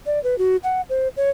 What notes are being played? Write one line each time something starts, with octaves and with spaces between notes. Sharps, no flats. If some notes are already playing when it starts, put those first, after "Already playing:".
D5
B4
F#4
F#5
C5
C#5